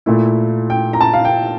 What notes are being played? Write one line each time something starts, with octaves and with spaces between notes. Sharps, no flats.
A#2 A3 E4
G5
A#5
A5
F5
G5